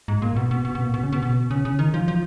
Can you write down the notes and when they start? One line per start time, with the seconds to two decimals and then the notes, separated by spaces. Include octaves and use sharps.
0.08 G#2
0.22 A#2
0.36 B2
0.51 B2
0.65 B2
0.75 B2
0.84 A#2
0.94 B2
1.03 C#3
1.12 B2
1.22 B2
1.51 C#3
1.65 C#3
1.79 D#3
1.94 F3
2.08 F3